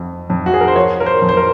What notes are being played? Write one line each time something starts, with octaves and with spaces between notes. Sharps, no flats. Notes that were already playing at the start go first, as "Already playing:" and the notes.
Already playing: F2
F2
F#4
G#4
A#4
C5
F3 C#5
A#4
C5
F2
C5
A#4